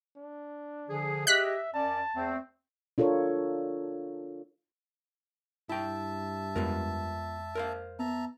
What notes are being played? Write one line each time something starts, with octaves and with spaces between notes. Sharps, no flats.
D4
D3 F3 G#4
G4 G#4 D#5 E5 F#6 B6
F#2 C#4 D5 A5
E2 A3 C4
D4 F4 A4 A#4 C#5
G2 E4 E5 G5 A5
F2 G#3 B3 F4 A#4
A#4 C5 F5
B3 E5 A5 A#5